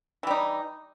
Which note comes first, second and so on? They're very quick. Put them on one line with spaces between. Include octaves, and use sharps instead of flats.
E3 G3 D#4